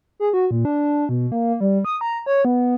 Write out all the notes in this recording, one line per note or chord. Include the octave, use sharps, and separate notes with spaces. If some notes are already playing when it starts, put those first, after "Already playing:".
G#4
F#4
A#2
D4
B2
A#3
G3
D#6
A#5
C#5
B3